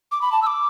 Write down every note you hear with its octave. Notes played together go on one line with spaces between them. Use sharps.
D6
B5
A5
E6
D6